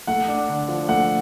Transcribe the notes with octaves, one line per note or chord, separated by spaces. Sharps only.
A3 F#5
D4
D3
F3
A3 F#5